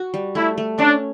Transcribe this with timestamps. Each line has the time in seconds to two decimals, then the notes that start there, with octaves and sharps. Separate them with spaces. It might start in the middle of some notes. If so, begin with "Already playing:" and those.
Already playing: F#4
0.14 G3
0.35 A3 E4
0.58 A3
0.79 C#4 D4